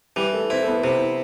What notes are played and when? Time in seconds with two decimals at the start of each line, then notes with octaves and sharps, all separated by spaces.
0.16 E3 G3 G4
0.33 A3 A4
0.50 C4 E4 C5
0.62 A4
0.67 B3 B4
0.78 A4
0.84 C3 B3 B4